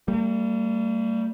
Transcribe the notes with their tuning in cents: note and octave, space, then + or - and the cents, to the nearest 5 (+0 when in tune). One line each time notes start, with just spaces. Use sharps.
G3 +0 A#3 -45